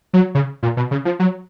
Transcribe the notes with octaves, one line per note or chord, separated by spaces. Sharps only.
F#3
C#3
A#2
B2
C#3
F3
F#3